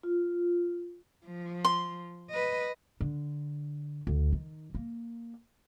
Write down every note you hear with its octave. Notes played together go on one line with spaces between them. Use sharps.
F4
F3
C6
B4 D#5
D3
D2
D#3
A#3